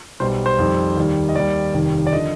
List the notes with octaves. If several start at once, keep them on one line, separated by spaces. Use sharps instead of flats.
B1 B2 G3 C5
C5
F2 D#3 G3
D#2 D#3 G3
D#5
D#2 D#3 G3 D5
F1 D#2 D#3 G3
D5
D3 F3 D#5